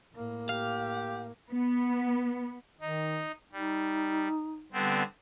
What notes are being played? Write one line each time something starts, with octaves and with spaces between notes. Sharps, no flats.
A2 A#3
G4 F5
B3
D#3 D#4
G3 D#4
D3 G3 B3 C4